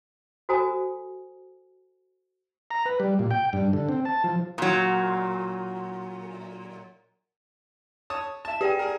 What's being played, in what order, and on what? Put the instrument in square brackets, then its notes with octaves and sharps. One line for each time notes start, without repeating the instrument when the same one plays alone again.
[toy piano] F#4 A4 C5 G#5 A#5 D#6
[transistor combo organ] A#5
B4
G3
A#2
G5
G2
D3
C4
A5
F3
[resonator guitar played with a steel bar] A#2 F#3
[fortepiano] C#5 A5 D#6
[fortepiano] E5 A5 [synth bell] E7
[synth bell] G4 D5 G5 [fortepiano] G#4
[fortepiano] G#4 A#4